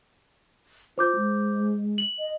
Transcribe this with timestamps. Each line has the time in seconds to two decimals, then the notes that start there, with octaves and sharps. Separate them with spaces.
0.98 F4 C5 D6 G6
1.16 G#3
1.98 F#7
2.19 D#5